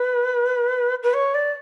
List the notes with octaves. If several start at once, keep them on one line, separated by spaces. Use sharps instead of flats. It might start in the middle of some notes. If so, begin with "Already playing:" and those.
Already playing: B4
B4
C#5
D5